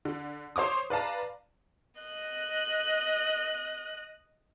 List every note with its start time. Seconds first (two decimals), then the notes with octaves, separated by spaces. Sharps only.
0.05 D3
0.56 C5 C#5 D6 D#6
0.90 B4 D5 F5 A5 A#5
2.01 D#5 F#6